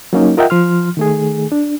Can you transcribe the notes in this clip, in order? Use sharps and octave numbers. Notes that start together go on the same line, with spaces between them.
F#3 A#3 C#4 D#4
F4 A#4 D#5 E5 F#5 G5
F3 C6 F6
D#3 A3 G#4
D4